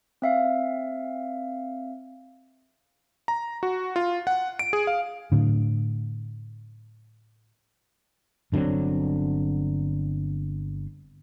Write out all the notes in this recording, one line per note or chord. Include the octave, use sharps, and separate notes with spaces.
C4 E5 F5
A#5
F#4
F4
F#5
D7
G#4
F5
A2 D3
G1 D3 F#3 C4